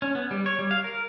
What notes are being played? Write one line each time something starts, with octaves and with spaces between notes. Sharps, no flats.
C#4
B3
G3
C#5
G3
F5
A#4